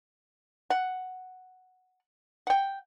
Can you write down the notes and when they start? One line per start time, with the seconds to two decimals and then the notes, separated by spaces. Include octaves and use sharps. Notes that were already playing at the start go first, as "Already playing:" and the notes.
0.70 F#5
2.47 F#5 G5